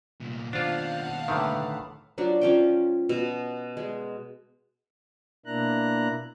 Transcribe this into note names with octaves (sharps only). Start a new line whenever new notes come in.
C2 A#2
D#2 B2 D4 F4 C5 F5 F#5 A5
A2 D3 D#3 B4 E5
F3 F#3 D4
F3 C#4 G5
B2
G#3
B2 A#3 D4 E4 A#5 F#6